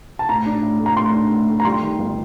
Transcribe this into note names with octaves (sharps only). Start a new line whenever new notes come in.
A5
A2 A#5
D4
A2
A3
A#5
A2 C6
D4
A2
A3
A#5
G3 C6
D#3
G1